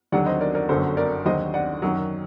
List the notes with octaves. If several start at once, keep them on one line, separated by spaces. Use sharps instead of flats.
D#2 D3 F#3 D5 F#5
C5 D#5
A#4 D5
A#4 D5
G1 F#2 D3 F#3 A4 C5
A#4 D5
D#2 D3 F#3 C5 D#5
D5 F#5
F#2 D#3 F#3